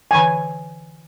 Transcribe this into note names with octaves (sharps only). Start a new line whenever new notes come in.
D3 E3 G5 G#5